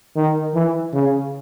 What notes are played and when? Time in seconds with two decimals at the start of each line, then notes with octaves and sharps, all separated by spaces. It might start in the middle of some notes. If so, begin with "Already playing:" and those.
0.16 D#3
0.54 E3
0.93 C#3